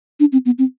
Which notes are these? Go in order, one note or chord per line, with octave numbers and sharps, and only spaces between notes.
D4
C4
B3
C4